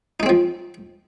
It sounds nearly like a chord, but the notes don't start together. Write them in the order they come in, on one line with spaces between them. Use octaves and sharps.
D#4 G#3 C4 F3